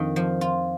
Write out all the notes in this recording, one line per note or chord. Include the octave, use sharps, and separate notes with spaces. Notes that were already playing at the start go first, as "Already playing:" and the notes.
Already playing: F2 D#3
F3
F4